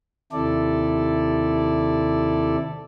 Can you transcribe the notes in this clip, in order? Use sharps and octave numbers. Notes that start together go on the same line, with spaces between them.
D#2 C3 E4 A4 D5